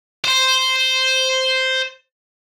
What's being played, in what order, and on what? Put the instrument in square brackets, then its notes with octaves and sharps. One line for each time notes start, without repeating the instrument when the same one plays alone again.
[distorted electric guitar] C5 C6